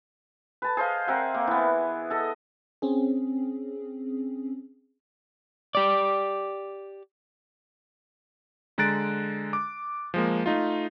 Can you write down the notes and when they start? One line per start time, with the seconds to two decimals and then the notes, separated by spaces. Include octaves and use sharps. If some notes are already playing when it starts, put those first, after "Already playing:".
0.62 B4 A5
0.77 G#4 C5 D#5 F5
1.07 C4 A#4 E5 F#5
1.35 A#3
1.47 E3 B3
2.10 A4 D#5
2.82 C4 C#4 G#4
5.75 G4 D5
8.78 D3 G#3 A#5 F#6 A6 D7
9.53 D6
10.14 F3 G#3 A#3
10.46 A3 D#4 F4